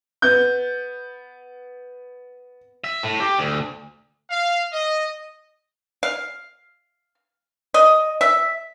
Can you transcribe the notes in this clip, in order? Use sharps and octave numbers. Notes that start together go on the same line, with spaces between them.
B3 G6
E5
A2
G4
D2
F5
D#5
F5
D#5
E5